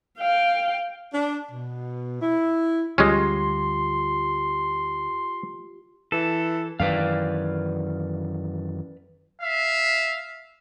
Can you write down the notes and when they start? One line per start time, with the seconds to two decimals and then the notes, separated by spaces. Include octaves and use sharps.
0.18 F5 G5
1.13 D4
1.50 B2
2.21 E4
2.98 D2 G3 G#3 C#4 F4 G4 C6
6.12 E3 A4
6.80 F#2 D#3 E3 B4 D5 F5
9.42 E5 F5